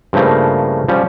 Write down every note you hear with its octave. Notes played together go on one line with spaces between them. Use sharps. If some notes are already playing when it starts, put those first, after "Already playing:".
G2 C#3 F3 A3 A#3
F3 G3 C#4